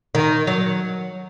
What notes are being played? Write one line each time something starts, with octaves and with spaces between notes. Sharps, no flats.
D#3
F#3